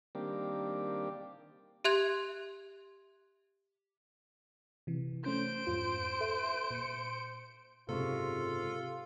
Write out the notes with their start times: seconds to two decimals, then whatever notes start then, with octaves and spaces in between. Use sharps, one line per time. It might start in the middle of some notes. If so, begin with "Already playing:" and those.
0.15 D#3 G3 A#3 C4 D4 G4
1.84 G4 E5 C6 F#6 G#6 F7
4.87 C3 E3
5.24 A3 C#4 C5 G6 D7
5.67 F2 G#2 F4
6.20 A4 E5
6.71 A#2 C#7
7.89 F#1 G#2 C3 F4 A4 C#6